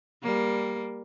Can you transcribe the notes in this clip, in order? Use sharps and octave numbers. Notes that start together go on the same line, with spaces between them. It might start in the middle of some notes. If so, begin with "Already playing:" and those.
G3 A#3